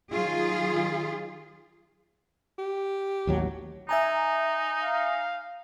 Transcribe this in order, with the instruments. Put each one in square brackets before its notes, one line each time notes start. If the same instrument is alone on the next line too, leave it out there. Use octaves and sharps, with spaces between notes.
[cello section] D#3 F#3 F4 G#4
[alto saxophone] G4
[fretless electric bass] A1 D#2 F#3
[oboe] D#4 [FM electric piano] E5 G#5 A#5
[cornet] F5